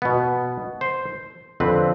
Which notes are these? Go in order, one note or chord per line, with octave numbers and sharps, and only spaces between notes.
B2 B3
C5
F2 D3 F3 C4 B4